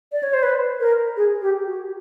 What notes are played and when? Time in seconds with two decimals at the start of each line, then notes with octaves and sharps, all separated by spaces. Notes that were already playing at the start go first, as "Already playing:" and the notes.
0.12 D5
0.23 C#5
0.34 C5
0.43 B4
0.80 A#4
1.17 G#4
1.42 G4
1.67 F#4